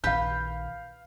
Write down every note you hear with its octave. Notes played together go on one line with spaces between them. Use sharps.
A#1 D#3 B4 F5 G6